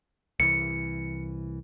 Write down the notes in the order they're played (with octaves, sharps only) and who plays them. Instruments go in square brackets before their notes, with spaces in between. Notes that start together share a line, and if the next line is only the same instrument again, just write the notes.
[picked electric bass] C2 E3 [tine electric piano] C#7